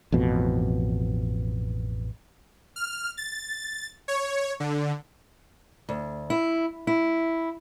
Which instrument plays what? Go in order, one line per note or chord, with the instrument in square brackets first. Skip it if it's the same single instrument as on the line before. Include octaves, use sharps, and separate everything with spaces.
[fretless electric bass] A1 F2 B2
[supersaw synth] F6
A6
C#5
D3
[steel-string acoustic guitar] D2
E4
E4